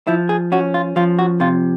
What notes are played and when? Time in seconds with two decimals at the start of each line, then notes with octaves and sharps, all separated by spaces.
0.07 F3 E4
0.29 G#4
0.52 C#4 F#4
0.74 F4
0.96 F3 F4
1.19 F#4
1.40 C3 F4